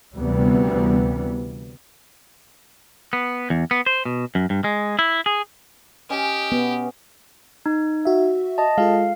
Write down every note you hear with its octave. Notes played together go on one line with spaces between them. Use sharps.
D2 C3 E3 G3 B3
B3
E2
B3
C5
B2
F#2
G2
G#3
E4
G#4
C#4 G4 D#5
B3
D#4
F#4 E5
D#5 A5
G#3 F4 A4 F5